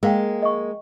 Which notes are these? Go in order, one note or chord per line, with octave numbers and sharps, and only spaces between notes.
G#3 A#3 A#4 F5 G5
D#5 C#6